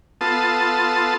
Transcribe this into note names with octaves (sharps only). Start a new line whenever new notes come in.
B3 F4 A4 A5 C6 D#6